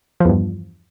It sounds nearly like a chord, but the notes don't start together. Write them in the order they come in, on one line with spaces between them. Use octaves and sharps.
F3 E2 G2